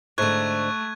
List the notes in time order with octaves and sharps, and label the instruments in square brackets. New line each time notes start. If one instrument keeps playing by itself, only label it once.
[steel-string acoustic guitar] G#2 D3 [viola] A3 [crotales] C#6 F#6 G#6